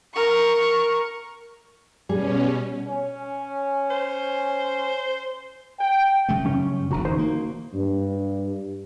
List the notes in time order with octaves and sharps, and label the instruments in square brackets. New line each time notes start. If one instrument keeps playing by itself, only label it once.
[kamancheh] A#4 C#6
[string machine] B2 C#4 [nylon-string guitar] G3 G#4
[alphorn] C#4
[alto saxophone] C5
[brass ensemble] G5
[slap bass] C#3 G3 A3
[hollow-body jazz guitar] F#2 C#4
[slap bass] E1 D3 [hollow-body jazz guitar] B1 F#4 A#5
[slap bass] E3 [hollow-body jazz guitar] D#4 F#4 C5
[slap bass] A#3
[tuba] G2